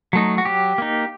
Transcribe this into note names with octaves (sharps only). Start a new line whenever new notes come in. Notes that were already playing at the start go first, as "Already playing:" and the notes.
F#3 A3 D#4
F#4
F#3 G4
A#3 D#4